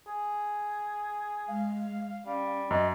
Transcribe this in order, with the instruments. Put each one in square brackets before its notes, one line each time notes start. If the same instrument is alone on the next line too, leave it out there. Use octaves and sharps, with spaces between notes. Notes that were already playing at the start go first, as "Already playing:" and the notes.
[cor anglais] G#4
[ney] G#3 [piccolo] F5
[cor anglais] G3 [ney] C#4
[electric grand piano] F#2 [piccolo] D#5